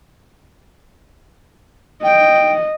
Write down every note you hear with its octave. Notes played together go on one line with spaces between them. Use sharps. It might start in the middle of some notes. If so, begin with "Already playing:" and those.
D#5 G5